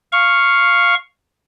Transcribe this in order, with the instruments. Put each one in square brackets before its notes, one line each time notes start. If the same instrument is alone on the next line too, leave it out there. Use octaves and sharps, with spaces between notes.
[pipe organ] F5 C#6